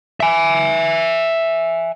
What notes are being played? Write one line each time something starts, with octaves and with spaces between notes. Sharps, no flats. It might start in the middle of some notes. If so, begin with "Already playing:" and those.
E5 G#5